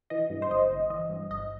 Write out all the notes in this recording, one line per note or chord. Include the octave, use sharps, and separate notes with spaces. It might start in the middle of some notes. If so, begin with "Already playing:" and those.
E3 D#5
G2
C5
G1 D#5
G1
E3 D#5
G2
G1 D#5